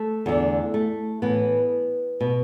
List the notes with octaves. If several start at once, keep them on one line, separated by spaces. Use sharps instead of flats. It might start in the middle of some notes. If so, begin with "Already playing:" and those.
Already playing: A3
E2 D3
A3
A2 E3 B3
B2